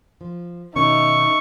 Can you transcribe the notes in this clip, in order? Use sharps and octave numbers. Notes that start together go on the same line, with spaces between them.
F3
B2 D#3 C#4 D#4 E5 C#6